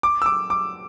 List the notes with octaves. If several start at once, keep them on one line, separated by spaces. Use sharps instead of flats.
D6
E6
D6
D6